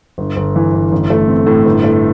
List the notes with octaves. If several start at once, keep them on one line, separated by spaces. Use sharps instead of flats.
G1
G1
E3
G1
A1
A3
C4
A2
G1
A3